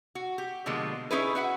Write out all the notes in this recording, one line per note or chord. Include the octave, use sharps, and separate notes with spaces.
F#4
G4
B2 D3 F3 G#3 A#3
C#4 D#4 E4 G#4 B4
F#4 E5 F#5